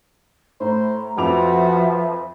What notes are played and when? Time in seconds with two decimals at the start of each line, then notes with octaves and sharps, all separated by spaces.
0.60 A2 C5 A#5
1.18 F2 F3 F4 F#4 B4 E5 D6 F7